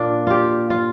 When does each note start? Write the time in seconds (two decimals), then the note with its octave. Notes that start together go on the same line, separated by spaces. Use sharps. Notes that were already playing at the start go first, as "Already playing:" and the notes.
Already playing: A#2 A#3 D4 F4
0.27 F4 G4
0.70 F4